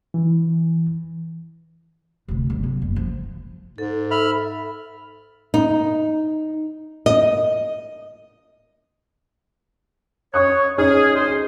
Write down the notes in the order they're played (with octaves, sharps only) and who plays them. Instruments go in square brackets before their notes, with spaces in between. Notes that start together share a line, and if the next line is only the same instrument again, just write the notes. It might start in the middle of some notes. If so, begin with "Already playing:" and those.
[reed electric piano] E3
[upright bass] D2 C3
G1
F#3
F#1
F3
[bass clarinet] G#2 [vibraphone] A4
[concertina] E5 B5 F6
[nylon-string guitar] D#4
D#5
[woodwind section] C#5 [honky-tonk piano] C#6 D#6 F#6
[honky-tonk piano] C#4 D#4 F6 [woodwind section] G#4
[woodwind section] D2 G#4 C5